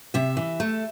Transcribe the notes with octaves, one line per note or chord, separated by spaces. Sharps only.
C3 E5
E3
A3